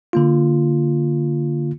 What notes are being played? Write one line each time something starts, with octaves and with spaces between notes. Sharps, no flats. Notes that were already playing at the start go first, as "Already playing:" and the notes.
D3 A#3 F4